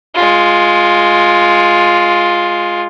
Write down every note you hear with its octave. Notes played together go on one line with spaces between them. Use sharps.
G#3 F4